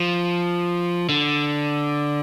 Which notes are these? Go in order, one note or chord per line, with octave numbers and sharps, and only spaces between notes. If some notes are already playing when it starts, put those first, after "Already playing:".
Already playing: F3
D3